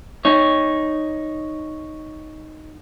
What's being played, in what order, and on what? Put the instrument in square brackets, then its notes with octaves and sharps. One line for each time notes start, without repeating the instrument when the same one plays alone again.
[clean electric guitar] D#4 C#5